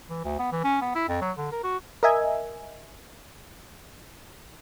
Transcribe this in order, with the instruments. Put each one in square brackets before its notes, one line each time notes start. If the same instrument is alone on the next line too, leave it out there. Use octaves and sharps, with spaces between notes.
[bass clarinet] E3
D2
B3
E3
C#4
B3
E4
F2
F#3
D3
A#4
F#4
[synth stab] A#4 D#5 E5 G#5